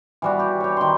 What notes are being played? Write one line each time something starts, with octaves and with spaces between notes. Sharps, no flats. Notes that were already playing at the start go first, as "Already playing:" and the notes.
E3 G3 F#4
G4
G4 C#5
D#3 C6